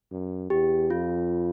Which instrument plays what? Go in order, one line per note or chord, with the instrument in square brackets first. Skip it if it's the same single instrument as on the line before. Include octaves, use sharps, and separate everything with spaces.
[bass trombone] F#2
[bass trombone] E2 [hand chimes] G4
[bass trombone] F2 [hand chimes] F4